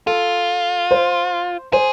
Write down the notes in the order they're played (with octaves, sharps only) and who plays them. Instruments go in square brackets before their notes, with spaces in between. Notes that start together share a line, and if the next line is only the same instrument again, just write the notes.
[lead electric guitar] F4 [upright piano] A4
[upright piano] C5
[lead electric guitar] G#4 [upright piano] C5